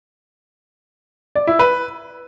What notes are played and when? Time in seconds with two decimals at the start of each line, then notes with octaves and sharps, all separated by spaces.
1.35 D5
1.47 E4
1.59 B4